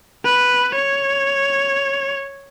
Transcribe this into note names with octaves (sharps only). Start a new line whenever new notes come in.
B4
C#5